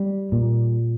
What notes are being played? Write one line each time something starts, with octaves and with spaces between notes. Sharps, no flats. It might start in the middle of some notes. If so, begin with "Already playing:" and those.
Already playing: G3
A#2